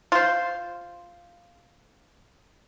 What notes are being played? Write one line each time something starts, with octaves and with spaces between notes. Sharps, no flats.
F4 C5